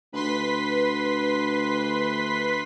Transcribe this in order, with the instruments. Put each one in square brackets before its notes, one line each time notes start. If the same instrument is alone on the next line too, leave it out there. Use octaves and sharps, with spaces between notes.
[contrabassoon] D2 [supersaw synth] B4 C6 B6